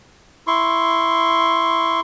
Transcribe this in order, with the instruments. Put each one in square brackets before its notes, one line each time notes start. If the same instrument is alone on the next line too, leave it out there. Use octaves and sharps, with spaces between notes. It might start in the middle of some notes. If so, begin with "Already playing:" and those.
[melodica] E4 C6 C#6